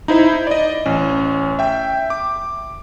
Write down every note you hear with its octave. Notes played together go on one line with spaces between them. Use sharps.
D#4 E4 C5 E5
D5 D#5
A1 C#4
E5 G5
D6